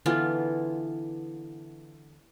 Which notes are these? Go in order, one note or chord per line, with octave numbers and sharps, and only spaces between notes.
D3 E3 B3 F4